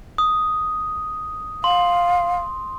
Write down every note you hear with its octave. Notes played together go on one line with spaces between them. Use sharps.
D#6
F5 C6